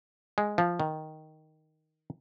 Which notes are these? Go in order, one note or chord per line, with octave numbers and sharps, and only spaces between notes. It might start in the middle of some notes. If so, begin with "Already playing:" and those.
G#3
F3
D#3